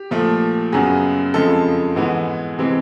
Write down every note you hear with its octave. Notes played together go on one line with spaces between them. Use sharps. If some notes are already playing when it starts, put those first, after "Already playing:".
Already playing: G4
A#2 F3 A3
F#2 C#3 F#3 B3 G#4
F2 C#3 F3 G#3 A4
G#2 E3 G#3 B3
C3 E3 G#3 C4